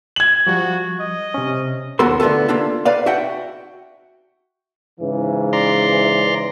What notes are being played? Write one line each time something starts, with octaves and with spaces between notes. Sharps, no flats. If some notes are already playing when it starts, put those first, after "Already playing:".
G#6 F#7
F3 G3 F#4
D#5
C3 C#4
D#2 B3 F#4 A4 A#4 C6
D3 A3 B3 F4 A4
A#3 D4 F4 A4
B4 D5 F5
F#4 E5 F#5 G5
G#2 C#3 E3
D5 A#5 C6